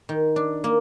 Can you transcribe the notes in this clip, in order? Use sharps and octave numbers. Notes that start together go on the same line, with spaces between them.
D#3
D4
A#3